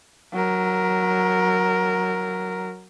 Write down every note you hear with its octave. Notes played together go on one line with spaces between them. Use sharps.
F#3 A#4